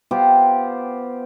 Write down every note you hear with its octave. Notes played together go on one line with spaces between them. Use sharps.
B3 F4 G4 C5